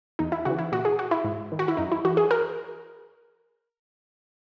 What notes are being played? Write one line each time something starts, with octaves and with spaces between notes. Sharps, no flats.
E2 D#4
E4
C#3 E3 F#4
E4
A#2 F#4
G#4
F#4
E4
G#2
D#3
F#4
E4
F#2 D#4
E4
E3 F#4
G#4
A#4